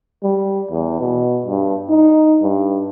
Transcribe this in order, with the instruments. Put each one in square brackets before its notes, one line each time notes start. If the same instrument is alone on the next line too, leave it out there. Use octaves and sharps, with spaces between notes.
[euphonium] G3
E2
B2
G2
D#4
G2